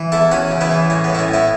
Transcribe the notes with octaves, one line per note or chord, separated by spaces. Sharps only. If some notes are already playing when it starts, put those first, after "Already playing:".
Already playing: E3
E2 E4 A4
E2 C#4 F#4
C#3
B3 E4
E3
A2 C#4
A2 B3
E4
C#4
A2
B3 E4